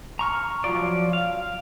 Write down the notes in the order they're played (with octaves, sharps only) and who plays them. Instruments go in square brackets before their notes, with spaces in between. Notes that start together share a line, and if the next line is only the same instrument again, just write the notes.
[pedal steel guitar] A#5 C#6 F6
F3 F#3 F4 D5
F5